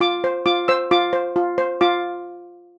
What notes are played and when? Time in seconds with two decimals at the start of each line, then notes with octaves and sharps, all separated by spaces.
0.01 F4 D6
0.24 C5
0.46 F4 D6
0.68 C5 E6
0.91 F4 D6
1.13 C5
1.36 F4
1.58 C5
1.81 F4 D6